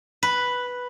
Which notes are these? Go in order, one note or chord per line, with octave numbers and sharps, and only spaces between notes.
B4